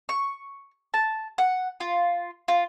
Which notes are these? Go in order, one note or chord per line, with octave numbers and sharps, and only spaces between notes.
C#6
A5
F#5
F4
F4